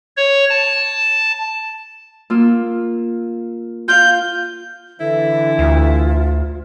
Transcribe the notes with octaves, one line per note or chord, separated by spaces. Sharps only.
C#5
A5
A#3 F4 E6
F4 F5 G6
D3 E3 E4 A4
D2 F4